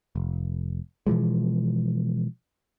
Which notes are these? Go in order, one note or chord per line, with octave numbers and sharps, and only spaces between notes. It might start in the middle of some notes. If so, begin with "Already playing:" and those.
F1
B2 E3 F3 G#3